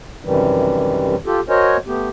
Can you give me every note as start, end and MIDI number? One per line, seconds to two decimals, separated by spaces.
0.25 1.15 42
0.25 1.15 48
0.25 1.15 51
0.25 1.15 52
0.25 1.15 55
1.26 1.40 65
1.26 1.40 67
1.26 1.40 69
1.49 1.77 66
1.49 1.77 70
1.49 1.77 72
1.49 1.77 73
1.49 1.77 75
1.49 1.77 80
1.87 2.09 57
1.87 2.09 59
1.87 2.09 67